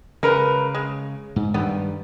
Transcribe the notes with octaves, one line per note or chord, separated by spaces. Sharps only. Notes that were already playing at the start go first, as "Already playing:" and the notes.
C#3 G#3 A#4 B4
G#3
G#2
G2 D#3 G3 B3